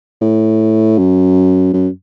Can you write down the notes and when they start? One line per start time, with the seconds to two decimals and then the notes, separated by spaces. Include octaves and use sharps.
0.21 A2
0.98 F#2
1.73 F#2